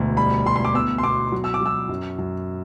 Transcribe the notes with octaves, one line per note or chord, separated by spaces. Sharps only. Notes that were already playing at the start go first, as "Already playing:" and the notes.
Already playing: E1 D2
G3 B5
D2 C6
C6
D6
B3 E6
C6
B2 D6
F#3
E6
D6
F#3 E6
F#2
F#2